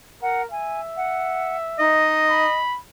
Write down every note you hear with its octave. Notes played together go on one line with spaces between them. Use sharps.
A#4 F#5
E5 G#5
F#5
D#4 D#5
B5